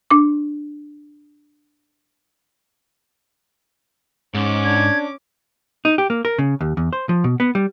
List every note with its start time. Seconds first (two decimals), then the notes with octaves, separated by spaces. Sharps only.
0.11 D4 D6
4.34 G#2 C#4 D6
4.65 D4 G#6
5.85 D#4
5.98 G4
6.10 A#3
6.25 A#4
6.38 C#3
6.61 D#2
6.77 E2
6.93 C5
7.09 F3
7.24 B2
7.40 B3
7.55 G3